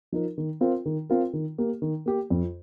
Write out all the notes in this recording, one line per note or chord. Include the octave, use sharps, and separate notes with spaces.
F3 D#4 A#4
D#3
C4 F4 A#4
D#3
C4 F4 A#4
D#3
A#3 G4
D#3
A#3 G4
F2